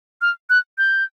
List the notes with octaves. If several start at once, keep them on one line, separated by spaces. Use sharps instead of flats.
F6
F#6
G6